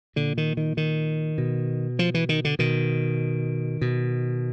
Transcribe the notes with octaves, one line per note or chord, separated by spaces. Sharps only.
A#2 D3
D#3
D#3
D#3
B2
F3
E3
D#3
D3
B2 D#3
B2